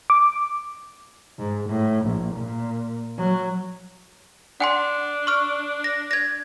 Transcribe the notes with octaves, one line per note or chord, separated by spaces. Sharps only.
D6
G#2
A2
A#1
A#2
F#3
D4 F#5 G#5 C6
C#6 F6
A#6
G#6 A#6